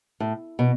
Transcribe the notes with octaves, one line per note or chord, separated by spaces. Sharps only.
A2
B2